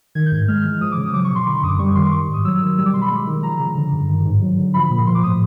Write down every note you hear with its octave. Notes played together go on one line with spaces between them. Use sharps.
D#3 G#6
G6
G#2
G#3 F6
E3
F3 D#6
D6
C#3
D#6
F#3 D6
C#6
B2
C6
D3 B5
C#6
F#2 D#6
D6
G3 C#6
D#3 C6
D6
D#3 C#6
G#2
D#6
F#3 E6
D#3
G3 E6
D6
B2 C6
B5
G#3
D#3
F3 A#5
C#3
D3
G2
D#3
G#2
F#3
D3
F3 B5
A#2
F3 C6
D6
A2 D#6